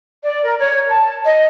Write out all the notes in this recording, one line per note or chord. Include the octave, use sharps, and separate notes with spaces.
D5
A#4
C#5
A5
D#5